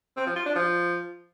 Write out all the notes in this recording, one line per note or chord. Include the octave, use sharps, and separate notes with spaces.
C4
F3
F4
D4
F3